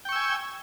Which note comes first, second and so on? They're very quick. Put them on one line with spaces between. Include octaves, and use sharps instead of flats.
G5 C#6 E6 G#5